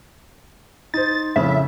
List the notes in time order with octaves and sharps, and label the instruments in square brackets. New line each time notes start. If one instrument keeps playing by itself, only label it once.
[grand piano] D#4 C5 [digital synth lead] A6
[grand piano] F2 A2 C#3 [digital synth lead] E5